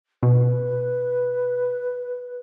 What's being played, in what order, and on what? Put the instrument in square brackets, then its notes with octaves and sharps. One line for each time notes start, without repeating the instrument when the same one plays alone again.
[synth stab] B2 [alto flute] B4